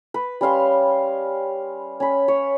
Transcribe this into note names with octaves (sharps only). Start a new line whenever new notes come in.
B4
G3 C#4 F5 C6
C#4 B5
C#5